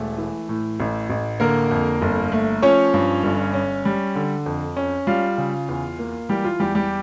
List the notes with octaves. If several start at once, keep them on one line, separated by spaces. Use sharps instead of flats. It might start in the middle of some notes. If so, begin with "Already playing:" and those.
Already playing: E1 A3
E3
A2
A1
A1
D3 A#3 A#4
F2
G1
A3
F3 C#4 C#5
G2
G1
C#4
G3
D3
F2
C#4
G3 F4 F5
C#3
E2
A#3
E3 G3 G4
F4
E2 G3 G4
G3 G4